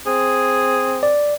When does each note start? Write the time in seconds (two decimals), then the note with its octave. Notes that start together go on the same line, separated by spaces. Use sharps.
0.07 C4 G#4
1.03 D5